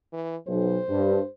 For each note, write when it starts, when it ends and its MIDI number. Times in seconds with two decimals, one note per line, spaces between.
0.13 0.36 52
0.47 0.77 35
0.47 1.29 72
0.88 1.19 43